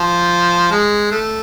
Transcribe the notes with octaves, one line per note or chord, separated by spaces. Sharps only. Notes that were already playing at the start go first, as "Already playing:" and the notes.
Already playing: F3
G#3
A3